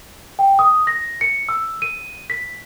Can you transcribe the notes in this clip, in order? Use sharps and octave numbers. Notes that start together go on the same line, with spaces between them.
G5
D#6
A#6
C#7
E6
D#7
B6